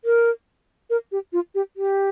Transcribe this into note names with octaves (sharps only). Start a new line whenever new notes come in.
A#4
A#4
G4
F4
G4
G4